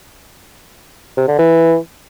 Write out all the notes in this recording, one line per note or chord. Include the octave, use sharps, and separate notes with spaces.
C3
D3
E3